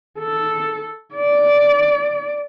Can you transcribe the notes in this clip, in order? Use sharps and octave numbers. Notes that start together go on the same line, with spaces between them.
A4
D5